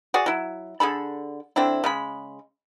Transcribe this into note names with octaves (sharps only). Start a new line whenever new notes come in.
F#4 G#4 D5
F#3 E4
D3 G#4 A4 B5
D3 C4 D4 E4
C#3 G#3 B5